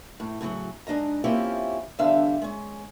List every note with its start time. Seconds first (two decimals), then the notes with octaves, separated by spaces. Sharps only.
0.20 A2
0.41 A2 C#3 E3 F#3
0.87 G#2 D4 D#5 A#5
1.24 A#3 C4 C#4 E4 F4 G4
1.99 E2 D3 G3 D4 E5 F5
2.42 G#3 C#4